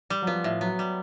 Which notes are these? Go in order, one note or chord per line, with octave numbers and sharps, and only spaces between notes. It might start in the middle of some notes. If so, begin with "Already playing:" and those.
G3
F#3
F3 B3
A2
F#3 B3
G3